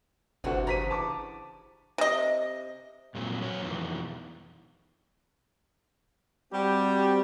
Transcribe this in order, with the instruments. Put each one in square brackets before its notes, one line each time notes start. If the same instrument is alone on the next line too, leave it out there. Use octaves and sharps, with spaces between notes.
[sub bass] G1 [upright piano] D2 F#4 [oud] C3 E3
[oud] C#3 E3 D4 [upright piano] A#5 B6 D#7
[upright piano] A5 D6
[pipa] C3 D#5
[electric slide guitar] G2 A#2 F#3 C4
F#3 D4 C#5
F2 B2 D#3 E3
[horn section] G3 C4 F#4 G4